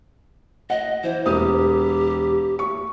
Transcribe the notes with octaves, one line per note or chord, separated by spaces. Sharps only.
D#5 F#5
E3 C5
E1 G4 D#6
C#6